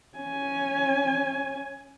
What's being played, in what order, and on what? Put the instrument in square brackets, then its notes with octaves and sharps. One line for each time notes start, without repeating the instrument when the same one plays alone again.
[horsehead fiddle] C#4 G#5